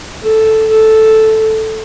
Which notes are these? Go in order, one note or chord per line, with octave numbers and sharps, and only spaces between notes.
A4
A4